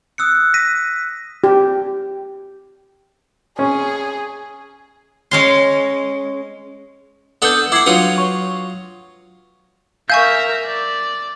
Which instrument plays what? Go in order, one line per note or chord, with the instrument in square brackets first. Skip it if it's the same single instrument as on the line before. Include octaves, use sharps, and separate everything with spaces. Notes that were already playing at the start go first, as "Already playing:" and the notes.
[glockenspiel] D#6 E6 F#6 C#7
A#6 B6 D#7
[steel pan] G4
[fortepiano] C#4 [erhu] G#4
[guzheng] G#3 C#4 C6
[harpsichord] B3 D4 A4 [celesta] F#5 D#6 G6
[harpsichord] E4 F#5 [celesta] D6 G#6 C7
[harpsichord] F#3 F4 D#6 [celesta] D4 B4 C#7
[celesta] C#5 C#6
[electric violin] A#4 E5 [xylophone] F5 G#5 C#6 [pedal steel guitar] G6
[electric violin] D5